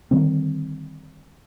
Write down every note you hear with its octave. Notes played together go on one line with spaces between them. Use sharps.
D3 D#3 G3 C4